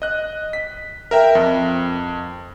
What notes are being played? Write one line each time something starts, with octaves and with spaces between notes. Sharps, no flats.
D#5 F#6
B6
A#4 E5 G5
F2